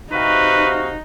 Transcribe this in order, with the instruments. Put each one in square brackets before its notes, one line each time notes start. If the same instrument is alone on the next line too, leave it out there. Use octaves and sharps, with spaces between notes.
[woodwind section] C3 F#4 F5 [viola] D#4 [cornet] B4